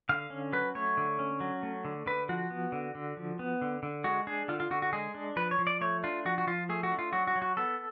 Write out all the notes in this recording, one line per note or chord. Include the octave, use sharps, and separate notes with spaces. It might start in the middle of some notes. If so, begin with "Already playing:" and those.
D3 F5
C#4
F#3 B4
A3 C#5
D3
C#4
F#3
A3
D3
D3 B4
F3 F#4
B3
D3
D3
F3
B3
D3
D3
G#3 F#4
D4 G#4
D3 F4
F4
D3 F#4
F#4
G#3 G#4
D4
F3 B4
C#5
F3
D5
A3 C#5
D4 F4
F3 F#4
F#4
F3 F4
A3 G#4
F#4
D4
F4
F#3 F#4
F#4
F#3
F#4
B3 A4